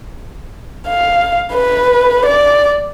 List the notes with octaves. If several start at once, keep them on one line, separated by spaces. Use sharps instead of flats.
F5
B4
D5